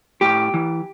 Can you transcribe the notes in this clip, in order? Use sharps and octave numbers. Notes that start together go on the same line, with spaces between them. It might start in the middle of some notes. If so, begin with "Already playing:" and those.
A2 G4
E3